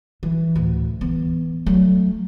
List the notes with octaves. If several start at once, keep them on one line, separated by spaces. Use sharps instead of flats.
E3
D2 A2
E3 B3
F#3 A3